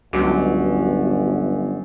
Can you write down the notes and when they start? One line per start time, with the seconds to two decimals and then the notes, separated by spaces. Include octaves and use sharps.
0.13 G1 C#2 F#2 F#4 D6